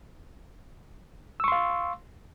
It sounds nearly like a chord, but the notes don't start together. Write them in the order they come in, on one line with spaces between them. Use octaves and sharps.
E6 C#6 C6 F5